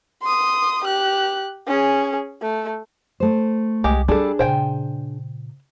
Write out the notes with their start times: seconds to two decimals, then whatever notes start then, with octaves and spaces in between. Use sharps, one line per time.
0.23 C6 D#6
0.85 G4 F#6
1.68 C#4 G#4
2.42 A3
3.20 A3 C5
3.84 C2 G#3 G4
4.08 G3 A3 D4 G#4 A4
4.39 A#2 C#3 C5 G5 G#5